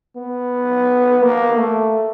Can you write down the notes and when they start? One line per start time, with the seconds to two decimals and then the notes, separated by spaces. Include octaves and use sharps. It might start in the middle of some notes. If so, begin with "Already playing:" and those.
0.16 B3
1.23 A#3
1.58 A3